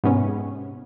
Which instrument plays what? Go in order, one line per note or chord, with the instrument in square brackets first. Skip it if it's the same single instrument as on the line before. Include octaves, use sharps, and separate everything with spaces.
[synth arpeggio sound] G#2 C3 B3 C#4